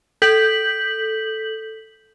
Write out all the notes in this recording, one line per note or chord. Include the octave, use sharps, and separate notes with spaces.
A4 G6 B6 F#7